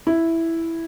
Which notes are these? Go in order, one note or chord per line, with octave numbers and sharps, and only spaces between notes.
E4